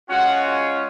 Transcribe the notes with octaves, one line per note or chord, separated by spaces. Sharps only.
G#3 C#4 F4 F#4 F#5